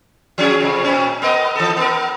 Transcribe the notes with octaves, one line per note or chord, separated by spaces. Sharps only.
F3 C#4 G#4
F2 C3
A#2 C4 C#4
B3 A#4 D#5
E3 A4
B3 A#4